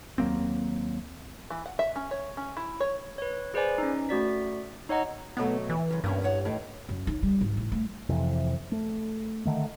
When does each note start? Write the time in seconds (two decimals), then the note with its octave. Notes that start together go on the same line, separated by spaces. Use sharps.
0.18 D#2 F#3 A#3 C4
1.50 E3
1.66 F#5
1.79 E5
1.96 C#4
2.11 C#5
2.37 C#4
2.57 E4
2.80 C#5
3.18 B4 C#5
3.54 G#4 B4 C5 D5 G#5
3.78 C#4 D#4
4.09 A3 F#4 D5 B6
4.89 D#4 C#5 D#5 F#5 A#5
5.37 B2 F#3 A3 B3
5.69 E3
5.91 F#2 C#3
6.04 G2 A#3 B3 C#4
6.23 E2 C#5 F#5
6.45 A2 D#3
6.89 F#2
7.07 D#4
7.23 G3
7.41 G#1
7.57 A1
7.72 A3
8.09 F2 C3 E3
8.72 A3
9.46 D3 D#3 A3